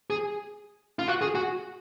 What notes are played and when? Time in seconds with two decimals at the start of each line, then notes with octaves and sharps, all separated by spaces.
0.10 G#4
0.99 F4
1.08 F#4
1.21 G#4
1.35 F#4